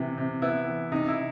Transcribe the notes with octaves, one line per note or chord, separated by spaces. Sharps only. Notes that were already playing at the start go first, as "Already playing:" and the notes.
Already playing: C3 E3 B3
C3
B3 E4
E3
C3 D#4
E4
C3